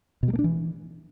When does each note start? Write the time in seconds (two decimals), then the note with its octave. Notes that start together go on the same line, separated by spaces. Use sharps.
0.23 B2
0.28 G3
0.33 A#3
0.39 D4
0.44 E3